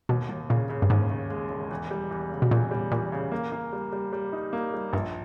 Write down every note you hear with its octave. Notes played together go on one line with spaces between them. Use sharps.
D#2 B2
D#2
A#2 C#3
C#3
G2
D#2 G#2
C#3
G#3
E1
E2
G3
E2
C#3
B2
E2 A#2
G3
E2 A#2
C#3
A#3
A#3
G3
G3
G3
D#4
A#3
G3
A#1 G2